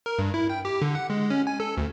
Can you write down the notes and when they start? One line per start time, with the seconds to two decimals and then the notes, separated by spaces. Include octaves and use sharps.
0.06 A#4
0.19 G2
0.34 E4
0.50 G5
0.65 G4
0.82 D3
0.95 F#5
1.10 G#3
1.30 C#4
1.47 G#5
1.60 A4
1.77 D2